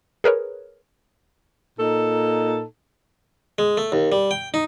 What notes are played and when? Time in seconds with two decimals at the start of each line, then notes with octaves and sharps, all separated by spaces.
0.24 G#4 A#4 B4 C#5
1.79 A#2 D#4 A4
3.59 G#3
3.77 A3
3.92 D#2
4.12 G3
4.31 G5
4.54 D#4